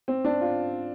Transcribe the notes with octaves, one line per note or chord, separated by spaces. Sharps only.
C4
D4
F4